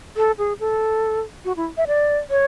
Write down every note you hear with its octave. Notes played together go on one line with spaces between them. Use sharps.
A4
G#4
A4
F#4
E4
E5
D5
C#5